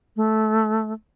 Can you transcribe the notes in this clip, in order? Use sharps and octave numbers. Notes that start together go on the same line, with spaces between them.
A3